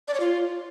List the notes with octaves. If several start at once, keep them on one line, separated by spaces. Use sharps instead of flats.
D5
C#5
F4